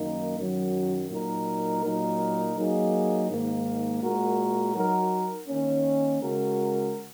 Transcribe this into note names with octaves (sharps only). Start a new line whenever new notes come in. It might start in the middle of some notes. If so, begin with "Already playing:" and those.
Already playing: F#2 D#3 A#3 D#4
F#2 D#3 F#3
A#2 F#3 D#4 A#4
A#2 F#3 D#4 A#4
F#3 A#3 D#4 G#4
G#2 D#3 A#3
A#2 G#3 F#4 A#4
F#3 D#4 F#4 A#4
D#3 A#3 C#4
C#3 G#3 F#4 A#4